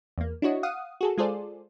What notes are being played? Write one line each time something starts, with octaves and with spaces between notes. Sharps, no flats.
E2 A#3
D4 E4 F#4 C#5 D#5
F5 F#5 D#6
F#4 G#4 A4
G#3 F4 G#4 A4 C5 D5